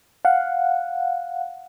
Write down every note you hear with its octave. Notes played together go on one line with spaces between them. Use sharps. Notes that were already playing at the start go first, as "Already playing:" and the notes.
F5 F#5